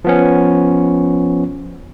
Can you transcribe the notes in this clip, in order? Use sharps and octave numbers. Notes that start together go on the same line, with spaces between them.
F3 B3 C#4